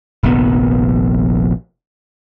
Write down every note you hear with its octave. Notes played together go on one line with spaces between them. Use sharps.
F1 A#1 D#3 B3